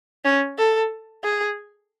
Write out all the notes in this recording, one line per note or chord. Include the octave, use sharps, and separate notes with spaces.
C#4
A4
G#4